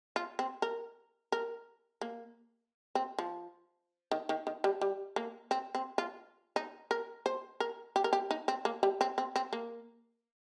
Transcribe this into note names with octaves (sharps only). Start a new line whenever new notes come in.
F4
C4
A#4
A#4
A#3
C4
F3
D#3
D#3
D#3
G3
G3
A#3
C4
C4
F4
D#4
A#4
C5
A#4
G4
A#4
G4
D#4
C4
A#3
G3
C4
C4
C4
A#3